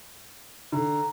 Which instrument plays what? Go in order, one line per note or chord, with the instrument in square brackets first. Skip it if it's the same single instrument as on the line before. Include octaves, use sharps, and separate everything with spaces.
[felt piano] D3 [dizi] A#5